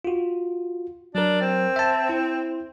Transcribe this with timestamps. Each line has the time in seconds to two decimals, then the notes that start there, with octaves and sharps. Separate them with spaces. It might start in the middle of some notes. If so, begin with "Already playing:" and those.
0.05 F4 F#4
1.15 F#3 D4 A#4
1.41 C4
1.76 E5 A5
2.09 E4